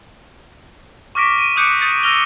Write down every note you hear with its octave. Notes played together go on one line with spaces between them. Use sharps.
C#6 D6 F6 A#6 B6 D7
D7 D#7
D6 D#6 F#6 G6 C#7 D7
D#6 G6 A6 C#7
E6 F6 A#6 D#7 F7 G7